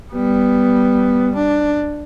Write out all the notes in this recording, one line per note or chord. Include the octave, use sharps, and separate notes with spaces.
G3 B3
D4